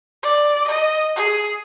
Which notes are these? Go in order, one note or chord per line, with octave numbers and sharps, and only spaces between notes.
D5
D#5
G#4